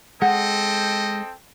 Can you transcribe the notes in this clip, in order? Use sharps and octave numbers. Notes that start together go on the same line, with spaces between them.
G#3 C4 A4 D#5 F#5 G5